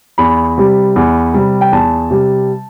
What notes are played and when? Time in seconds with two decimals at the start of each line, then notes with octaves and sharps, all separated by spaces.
0.18 E2 B5
0.58 C3 G3
0.96 E2
1.34 C3 G3
1.61 G5
1.72 E2 A5
2.11 C3 G3